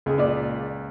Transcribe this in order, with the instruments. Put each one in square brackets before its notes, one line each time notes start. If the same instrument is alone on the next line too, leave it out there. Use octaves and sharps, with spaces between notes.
[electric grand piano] C#2 [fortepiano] G#3 G#4
[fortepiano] A#2 D5